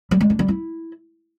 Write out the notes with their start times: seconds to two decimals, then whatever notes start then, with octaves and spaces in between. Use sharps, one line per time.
0.11 G3
0.21 G#3
0.30 D4
0.39 G3
0.48 E4